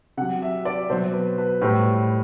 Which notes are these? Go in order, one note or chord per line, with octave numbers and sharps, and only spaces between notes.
C3 F#3 F#5
E5
D5
B2 F#3 C5
B4
B4
A2 G3 C5